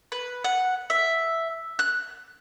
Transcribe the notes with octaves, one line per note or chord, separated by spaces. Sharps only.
B4
F#5
E5
F#6